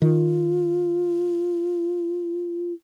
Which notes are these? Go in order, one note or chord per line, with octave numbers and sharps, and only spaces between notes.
D#3 F4